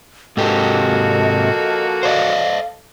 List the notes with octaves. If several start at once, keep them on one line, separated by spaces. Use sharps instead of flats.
G#2 C3 F3 A#3 F#4 G4 A4 D#5
C5 D5 D#5 F5